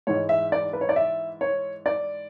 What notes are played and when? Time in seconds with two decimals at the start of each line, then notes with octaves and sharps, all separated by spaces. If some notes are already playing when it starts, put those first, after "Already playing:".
0.07 G#2 E3 G#3 C#5
0.29 E5
0.52 D5
0.73 B4
0.81 C#5
0.89 D5
0.96 E5
1.41 C#5
1.86 D5